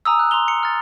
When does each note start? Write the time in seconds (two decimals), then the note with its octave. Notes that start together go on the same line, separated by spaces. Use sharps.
0.05 G#5 A#5 D#6 E6
0.19 F#6
0.31 A#5 C6 E6 F7 G7
0.48 C#7
0.63 F6 A6